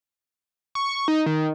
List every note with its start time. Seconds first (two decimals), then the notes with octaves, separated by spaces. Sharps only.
0.75 C#6
1.08 D#4
1.26 D#3